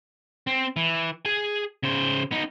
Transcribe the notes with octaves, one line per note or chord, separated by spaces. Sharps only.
C4
E3
G#4 G#5
C#3 C5
B3 D#4